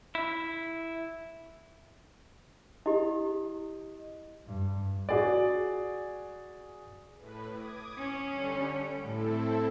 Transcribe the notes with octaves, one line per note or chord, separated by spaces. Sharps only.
E4
E4 G4 D#5
G2
F#4 G#4 D5
A2 B4
D6 D#6 G#6
C#4
D3 G3
D7
A2 C4 E4 A4